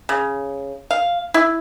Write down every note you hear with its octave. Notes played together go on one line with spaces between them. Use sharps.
C#3
F5
E4